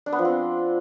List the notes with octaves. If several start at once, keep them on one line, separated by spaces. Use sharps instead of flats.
D4
B3
F3
C4